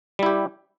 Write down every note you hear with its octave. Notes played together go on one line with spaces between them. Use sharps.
G3 E4 G4